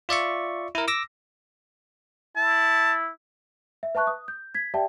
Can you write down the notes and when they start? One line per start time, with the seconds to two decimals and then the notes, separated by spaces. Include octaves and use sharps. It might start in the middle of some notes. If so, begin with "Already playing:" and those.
0.09 F4 D5 E5 C#6
0.75 E4 A#4
0.88 D6 E6 A#6
2.36 E4 A5
3.83 E5
3.95 B4 E5 A5 C#6 F#6
4.07 D#6
4.28 G6
4.54 G#6 B6
4.74 G4 D5 E5 G5 A5